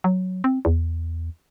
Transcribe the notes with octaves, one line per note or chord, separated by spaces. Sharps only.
F#3
C4
E2